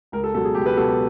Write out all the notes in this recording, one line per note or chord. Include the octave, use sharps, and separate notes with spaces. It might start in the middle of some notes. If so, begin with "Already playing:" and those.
C#2 A#4
A4
B2 F#3 A4
G#4
C#2 G4
B4
B2 F#3 A4